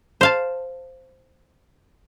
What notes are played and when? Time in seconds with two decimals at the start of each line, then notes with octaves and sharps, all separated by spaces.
0.21 C5 F5 A5